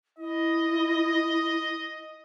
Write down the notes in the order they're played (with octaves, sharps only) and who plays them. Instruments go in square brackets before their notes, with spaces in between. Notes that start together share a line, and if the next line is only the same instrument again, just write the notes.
[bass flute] E4 [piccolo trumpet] D#5